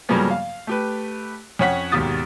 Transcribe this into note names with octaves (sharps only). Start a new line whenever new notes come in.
G2 C#3 F3 F#3 A#3 B3
F5
A3 G4 B4
F2 C#4 C#5 F#5 B6
G#1 D#2 B2 G4 D#6 A6